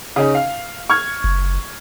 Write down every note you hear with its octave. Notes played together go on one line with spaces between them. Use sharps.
C#3 C#4 D#4
F5
C#6 F6 G#6
F#1